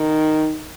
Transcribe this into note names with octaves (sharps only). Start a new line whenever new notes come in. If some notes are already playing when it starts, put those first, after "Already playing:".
Already playing: D#3